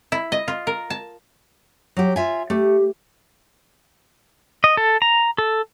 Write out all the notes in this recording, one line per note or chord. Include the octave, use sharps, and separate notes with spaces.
E4
D#5
F4
A#4
A5
F#3 G4
F4 E5 G#5
A3 G4
D#5
A4
A#5
A4